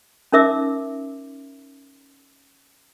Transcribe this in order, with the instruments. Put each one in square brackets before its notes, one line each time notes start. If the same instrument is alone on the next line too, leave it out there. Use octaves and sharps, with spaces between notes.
[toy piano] C#4 D#4 A#4 E5 D6 E6